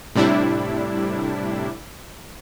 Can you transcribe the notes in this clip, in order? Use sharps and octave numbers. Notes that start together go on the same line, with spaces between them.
A2 C3 G3 D4 E4